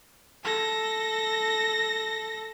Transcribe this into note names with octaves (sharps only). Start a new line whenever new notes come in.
A4 A#6